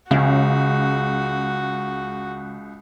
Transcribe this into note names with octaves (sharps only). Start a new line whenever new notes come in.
C#2 C#3 F#4